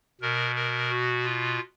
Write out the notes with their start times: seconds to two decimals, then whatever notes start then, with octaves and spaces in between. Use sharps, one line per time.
0.21 B2 A#4
0.55 A#4
0.90 F#4
1.24 F4